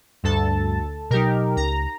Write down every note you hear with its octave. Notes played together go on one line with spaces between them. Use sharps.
D2 G2 A4 A5
B2 F#3 D#4 G4 A#4
C#2 A#5